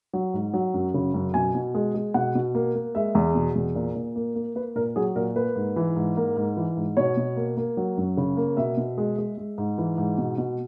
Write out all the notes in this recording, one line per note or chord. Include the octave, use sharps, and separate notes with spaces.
F#3
G#2
F#3
F#2
C#3
F#2
B2 G#5
B2
G#3
G#3
B2 F#5
B2
A#3
A#3
G#3 E5
E2
B2
E2
A#2
A#2
A#3
A#3
A#3 B4
A#2 A#4
F#3 G#4
A#2 A#4
A#3 B4
G#2
E3
G#2
A#3
G#2
E3
G#2
B2 C#5
B2
A#3
A#3
F#3
F#2
C#3
A#3
B2 E5
B2
G#3
G#3
G#3
G#2
E3
G#2
B2
B2